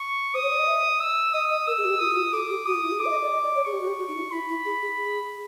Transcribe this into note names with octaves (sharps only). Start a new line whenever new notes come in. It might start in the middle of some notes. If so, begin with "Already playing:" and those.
Already playing: C#6
C5 D#6
C#5
D5
D#5
E5
E6
D#5 D#6
D#5
A#4 E6
G#4
F#4
G4
F4 D#6
F4
F#4
A4 D6
G4
F#4 D#6
F4
E4
G#4
A4 D6
E5
D#5
D5
D#5
D5
C#5
G#4 C#6
G4
F#4
G4
F#4
D#4
E4
E4 B5
E4
G#4
G#4
G#4